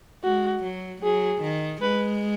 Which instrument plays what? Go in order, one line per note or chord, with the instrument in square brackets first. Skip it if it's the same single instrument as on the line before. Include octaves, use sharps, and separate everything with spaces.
[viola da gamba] G#3 [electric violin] F#4
[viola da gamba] F#3
[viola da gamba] F#3 [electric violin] G#4
[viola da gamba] D#3
[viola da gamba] G#3 [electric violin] B4